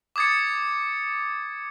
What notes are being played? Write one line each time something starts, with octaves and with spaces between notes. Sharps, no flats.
D6 D#6 G#6 A6 C#7